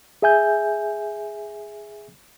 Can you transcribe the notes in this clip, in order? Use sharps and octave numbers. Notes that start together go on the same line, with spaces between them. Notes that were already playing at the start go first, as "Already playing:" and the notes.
G#4 E5 G#5 G6